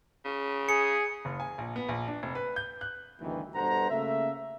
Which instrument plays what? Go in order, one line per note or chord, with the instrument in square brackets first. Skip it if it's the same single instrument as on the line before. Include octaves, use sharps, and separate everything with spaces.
[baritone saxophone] C#3
[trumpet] G#4 [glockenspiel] C#7
[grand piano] F#1
G#5
A#1
B3
A#1
D4
F1
B4
G6
F#6
[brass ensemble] D2 G2 B2 D#3 E3
G2 B2 A4 C5 F#5 A#5
C#3 A3 A#3 E5